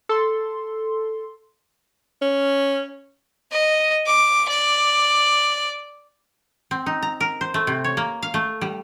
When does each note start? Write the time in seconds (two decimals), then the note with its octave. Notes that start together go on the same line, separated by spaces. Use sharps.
0.09 A4 C6
2.21 C#4
3.52 D#5
4.06 D6
4.49 D5
6.71 C4
6.86 D#4
7.02 A#5
7.20 A#4
7.41 C5
7.54 A3
7.67 C3
7.84 C#5
7.97 A#3
8.22 F5
8.34 A3
8.61 G3